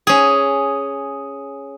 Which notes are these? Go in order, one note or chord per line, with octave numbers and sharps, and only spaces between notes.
C#4 G#4